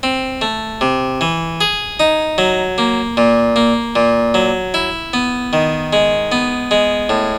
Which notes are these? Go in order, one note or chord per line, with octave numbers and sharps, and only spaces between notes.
C4
A3
C3
E3
G#4
D#4
F#3
A#3
A#2
A#3
A#2
F#3
E4
B3
D#3
G#3
B3
G#3
A2